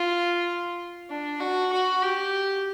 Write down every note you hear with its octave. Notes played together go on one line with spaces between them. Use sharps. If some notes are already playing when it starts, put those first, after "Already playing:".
Already playing: F4
D4
F#4
F#4
G4